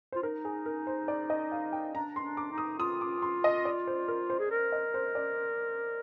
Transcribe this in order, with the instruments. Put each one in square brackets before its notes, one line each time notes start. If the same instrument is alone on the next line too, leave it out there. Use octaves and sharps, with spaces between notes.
[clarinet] F4 [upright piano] C5
[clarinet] D#4 [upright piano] A#4
[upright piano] G#4
A#4
C5
D5
D#5
F5
G5
[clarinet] D4 [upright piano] A#5
[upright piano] C6
[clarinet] D4
[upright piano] D6
[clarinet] D#4
[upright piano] D#6
[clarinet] F4 [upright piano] D#6
[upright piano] D6
C6
D#5
D5
C5
A#4
C5
[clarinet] G#4
A#4
[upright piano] D#5
C5
D5